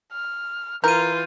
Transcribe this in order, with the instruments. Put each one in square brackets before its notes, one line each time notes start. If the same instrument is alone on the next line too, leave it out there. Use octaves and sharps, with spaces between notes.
[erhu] F6
[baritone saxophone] E3 [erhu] F4 [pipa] A#4 [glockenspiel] G6 D#7